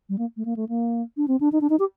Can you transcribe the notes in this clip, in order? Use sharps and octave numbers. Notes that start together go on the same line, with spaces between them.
G3
A#3
A3
A#3
A3
A#3
D4
C4
D4
D#4
D4
D#4
G4